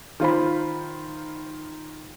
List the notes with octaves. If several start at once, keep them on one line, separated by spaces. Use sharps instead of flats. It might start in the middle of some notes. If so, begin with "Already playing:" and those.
D#3 F4 C5 B5